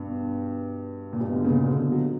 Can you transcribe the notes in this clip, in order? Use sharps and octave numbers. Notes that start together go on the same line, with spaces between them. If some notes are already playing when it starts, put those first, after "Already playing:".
Already playing: G2 B2
A#2
G2 B2
D3
A#2 C#3
C#3
B2 D3
F#3